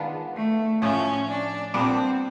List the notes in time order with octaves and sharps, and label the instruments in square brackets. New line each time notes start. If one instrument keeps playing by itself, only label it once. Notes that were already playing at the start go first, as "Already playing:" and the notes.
Already playing: [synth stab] D#3 G#3 B3 D4 F4
[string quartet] A3
[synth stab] A2 F3 A3 [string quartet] C#4
[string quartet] D4
[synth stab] A#2 G3 B3 D4 [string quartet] C4